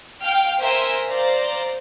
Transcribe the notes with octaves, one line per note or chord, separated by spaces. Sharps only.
F5 G5 F6
A#4 C5 E5 G#5
C5 D5 F5 A#5